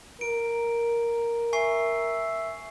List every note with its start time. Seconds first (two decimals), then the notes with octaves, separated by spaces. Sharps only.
0.21 A#4 D7
1.53 E5 G#5 C#6 C7